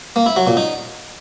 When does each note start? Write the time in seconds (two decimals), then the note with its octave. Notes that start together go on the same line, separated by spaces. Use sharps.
0.16 A#3
0.26 E4
0.36 F#3
0.47 A#2
0.57 D#4